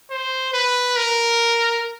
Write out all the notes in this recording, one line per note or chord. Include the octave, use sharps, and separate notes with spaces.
C5
B4
A#4